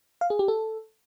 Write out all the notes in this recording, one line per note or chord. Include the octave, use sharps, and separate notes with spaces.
F5
G#4
G4
A4